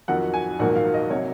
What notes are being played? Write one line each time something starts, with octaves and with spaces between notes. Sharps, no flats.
F2 D#3 F#3 F#5
G#5
A#1 G#2 D#3 F#3 A#3 F#5
F5
D#5
C3 F#3 A#3 C#5